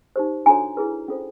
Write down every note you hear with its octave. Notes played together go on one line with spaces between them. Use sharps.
D#4 G4 C5
D4 F#4 A4 C#5 G#5 A#5
E4 G#4 B4
C#4 F4 A4 C5